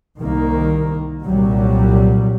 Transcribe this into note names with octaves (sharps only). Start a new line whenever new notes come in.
C2 D#3 A#3
C2 A#2 F#3 G3